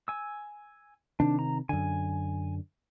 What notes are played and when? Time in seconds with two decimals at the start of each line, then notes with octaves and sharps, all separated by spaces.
0.08 G#5 E6
1.20 C3 D#3 D4
1.39 A#5
1.69 F#2 D3 G#5